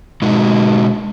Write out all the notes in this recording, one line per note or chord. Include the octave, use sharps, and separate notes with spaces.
B2 G#3 D#4 F#4